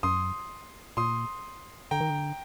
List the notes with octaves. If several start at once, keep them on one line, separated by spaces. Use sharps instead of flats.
F#2 C6 D#6
A#2 C6 D#6
D3 G5 A#5
D#3
D3